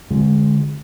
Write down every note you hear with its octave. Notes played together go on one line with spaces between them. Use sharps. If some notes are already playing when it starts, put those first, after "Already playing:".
D3 G#3